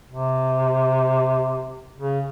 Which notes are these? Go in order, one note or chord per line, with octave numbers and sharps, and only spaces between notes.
C3
C#3